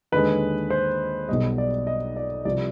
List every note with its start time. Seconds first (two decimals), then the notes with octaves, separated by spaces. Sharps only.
0.12 D#2 D3 G#3 B4
0.70 C5
1.29 B1 B2 G3 D#5
1.58 D5
1.87 D#5
2.17 D5
2.45 C2 C3 F3 D5